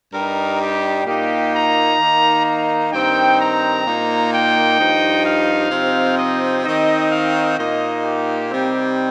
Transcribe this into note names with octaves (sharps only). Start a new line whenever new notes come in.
G2 G3 D#4 A#4
G4
A#2 A#3 D#4 G4
A#5
D#3 A#3 D#4
A#5
G2 D#3 C4 D#4 G5
A#5
A#2 A#3 D#4
G5
G2 F3 D#4
F5
C3 F3 C4 D#4
D#5
D#3 C4 D#4 D#5
F5
A#2 A#3 D#4 D#5
G4
C3 G3 C4 D#4